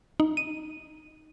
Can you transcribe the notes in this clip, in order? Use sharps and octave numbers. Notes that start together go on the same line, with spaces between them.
D#4
D#7